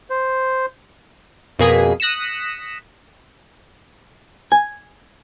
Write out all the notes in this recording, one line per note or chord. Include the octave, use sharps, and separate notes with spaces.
C5
F2 B2 A#3 G#4 B6
D#6 F#6 A#6 B6 C#7 E7
G#5